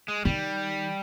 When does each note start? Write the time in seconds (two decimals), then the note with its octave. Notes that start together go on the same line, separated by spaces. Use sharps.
0.08 G#3
0.25 D#3 G3